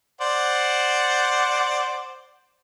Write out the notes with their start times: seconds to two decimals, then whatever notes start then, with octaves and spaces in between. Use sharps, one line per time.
0.21 C5 D5 F#5